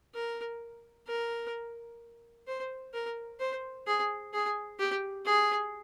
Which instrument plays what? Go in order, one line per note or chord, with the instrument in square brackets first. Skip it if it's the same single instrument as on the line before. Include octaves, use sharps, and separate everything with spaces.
[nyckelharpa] A#4
A#4
C5
A#4
C5
G#4
G#4
G4
G#4